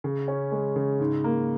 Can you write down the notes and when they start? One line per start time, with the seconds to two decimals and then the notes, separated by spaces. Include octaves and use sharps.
0.04 C#3
0.28 C#4
0.52 G#3
0.76 C#3
1.00 G#2
1.24 A#3